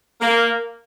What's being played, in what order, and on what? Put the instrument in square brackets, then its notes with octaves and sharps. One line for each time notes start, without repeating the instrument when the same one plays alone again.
[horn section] A#3